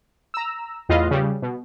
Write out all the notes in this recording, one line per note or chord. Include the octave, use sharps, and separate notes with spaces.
A#5 E6
E2 A2 F4 B4 D#5 F5
C#3 G3
B2